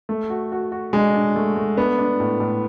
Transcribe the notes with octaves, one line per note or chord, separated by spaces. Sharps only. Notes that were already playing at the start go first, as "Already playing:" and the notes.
A3
F#4
F#4
F#4
G#3 D4
D4
A3
A3
B3 D4
D4
A2
A2